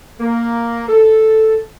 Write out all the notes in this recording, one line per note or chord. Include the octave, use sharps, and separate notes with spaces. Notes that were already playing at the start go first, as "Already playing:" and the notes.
A#3
A4